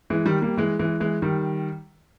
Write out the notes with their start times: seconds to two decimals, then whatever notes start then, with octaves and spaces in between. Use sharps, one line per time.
0.10 E3 G#3
0.26 D#3 G3
0.42 G3 A#3
0.57 E3 G#3
0.79 E3 G#3
1.00 E3 G#3
1.22 D#3 G3